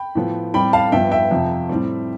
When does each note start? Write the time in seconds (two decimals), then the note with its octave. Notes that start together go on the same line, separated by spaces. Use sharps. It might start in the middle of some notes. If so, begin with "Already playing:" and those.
Already playing: G5 B5
0.15 A2 F3 B3
0.54 A2 G3 C4 G5 B5
0.73 F5 A5
0.92 G2 F3 B3 E5 G5
1.11 E5 G5
1.31 F2 C3 F3
1.69 A2 G3 C4